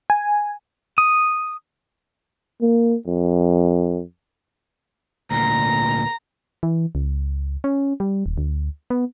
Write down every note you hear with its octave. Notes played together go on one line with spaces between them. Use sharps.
G#5
D#6
A#3
F2
D2 A#2 A#5
E3
C#2
C#4
G3
D#1
D2
B3